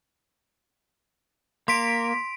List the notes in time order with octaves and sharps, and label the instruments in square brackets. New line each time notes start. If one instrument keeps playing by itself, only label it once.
[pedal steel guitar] A#3 [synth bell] C6 B6 D7